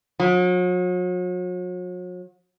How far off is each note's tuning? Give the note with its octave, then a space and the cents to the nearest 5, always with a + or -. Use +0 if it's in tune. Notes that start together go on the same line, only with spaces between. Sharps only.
F#3 -40